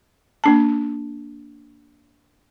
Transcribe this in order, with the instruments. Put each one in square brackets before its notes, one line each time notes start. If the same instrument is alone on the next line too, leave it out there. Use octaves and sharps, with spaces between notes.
[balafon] A#3 D4 A5